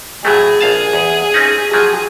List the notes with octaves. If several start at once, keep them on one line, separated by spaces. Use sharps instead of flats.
A2 F#3 A3 G#4
A#1 F5 A5
E2
C4 C#4 D#4
F3 F#3 G#4